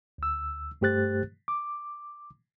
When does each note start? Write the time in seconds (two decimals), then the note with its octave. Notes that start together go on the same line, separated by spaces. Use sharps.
0.18 D2 E6
0.81 G2 A3 G4 C5 F#6 A6
1.48 D6